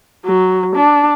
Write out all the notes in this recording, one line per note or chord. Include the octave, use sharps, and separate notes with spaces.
F#3
D4